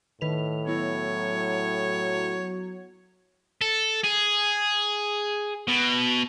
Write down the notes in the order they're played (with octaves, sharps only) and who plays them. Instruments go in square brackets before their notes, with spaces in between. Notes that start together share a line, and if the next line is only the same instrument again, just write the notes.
[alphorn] A2 [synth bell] D#3 B4 F7
[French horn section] F#3 [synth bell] B3 E4 [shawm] C#5
[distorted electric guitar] A4
G#4
B2